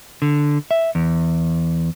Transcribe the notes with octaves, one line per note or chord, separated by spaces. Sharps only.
D3
E5
E2